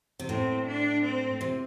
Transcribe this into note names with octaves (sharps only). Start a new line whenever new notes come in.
C3
A2 C4
D4
C4
C3